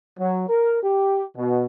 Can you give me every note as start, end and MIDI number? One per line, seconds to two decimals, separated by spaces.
0.20 0.45 54
0.49 0.81 70
0.83 1.24 67
1.37 1.66 47